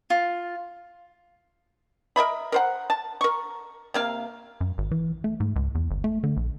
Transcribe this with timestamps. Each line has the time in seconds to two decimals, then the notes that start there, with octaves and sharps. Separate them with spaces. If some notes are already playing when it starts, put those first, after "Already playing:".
0.10 F4
2.16 A#4 D#5 E5 B5
2.52 A#4 C5 F#5
2.90 A5
3.21 A#4 C#6
3.94 C3 A#3 F5
4.61 F#2
4.78 G#1
4.91 E3
5.24 A3
5.40 G#2
5.56 C#2
5.75 E2
5.91 G1
6.04 A3
6.24 D3
6.37 A#1